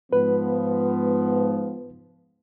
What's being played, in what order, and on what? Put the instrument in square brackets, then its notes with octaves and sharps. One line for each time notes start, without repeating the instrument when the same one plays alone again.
[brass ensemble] G#2 F3 B3 [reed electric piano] B4